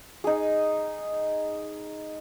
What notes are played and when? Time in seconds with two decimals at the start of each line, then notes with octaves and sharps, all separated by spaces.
0.24 D#4 G#4